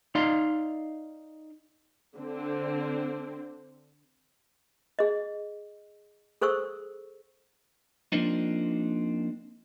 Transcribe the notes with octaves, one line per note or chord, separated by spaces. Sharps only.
D#4 D5 F5 C6
D3 C4
G#4 D#5
G#4 A4 C5 C#6 E6
F3 A#3 C4 D4 D#4